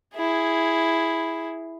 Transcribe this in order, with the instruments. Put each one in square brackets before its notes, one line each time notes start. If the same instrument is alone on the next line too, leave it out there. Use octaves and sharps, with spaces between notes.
[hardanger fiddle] E4 G#4